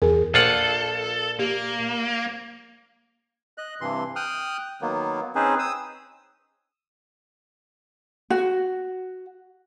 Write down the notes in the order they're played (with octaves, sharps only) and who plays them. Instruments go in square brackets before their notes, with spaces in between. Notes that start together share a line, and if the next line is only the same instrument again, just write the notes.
[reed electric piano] E2 G#4 [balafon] A#4
[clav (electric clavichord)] A#1 F4 F#5 [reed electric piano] A#2 [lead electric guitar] A4
[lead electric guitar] A#3 [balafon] G4
[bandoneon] D#5 F#6
G2 C3 E3 C6
G5 D#6 F6 F#6
D#3 F#3 A#3 B3
C4 C#4 D#4 G#4 B4 C5
D#6 E6
[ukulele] F#4